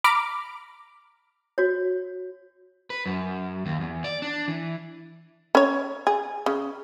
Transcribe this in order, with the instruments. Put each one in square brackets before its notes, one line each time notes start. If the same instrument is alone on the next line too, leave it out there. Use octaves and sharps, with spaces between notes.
[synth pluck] A#5 B5 D6 F6
[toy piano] F#4 C#5
[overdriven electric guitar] B4
F#2
D#2
E2
D5
D4
E3
[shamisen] C#4 C#5
G#4
C#3